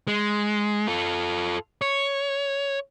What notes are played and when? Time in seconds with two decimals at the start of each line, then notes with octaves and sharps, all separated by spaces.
0.08 G#3
0.87 F4 A4
1.82 C#5